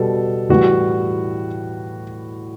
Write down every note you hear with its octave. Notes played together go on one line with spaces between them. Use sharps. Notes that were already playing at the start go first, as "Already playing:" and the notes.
Already playing: B2 G3 A4
A2 E3 G3 F#4